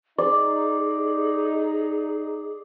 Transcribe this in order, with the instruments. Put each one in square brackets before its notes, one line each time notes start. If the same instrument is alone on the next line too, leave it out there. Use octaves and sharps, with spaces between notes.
[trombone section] D#4 [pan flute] G#4 [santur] D5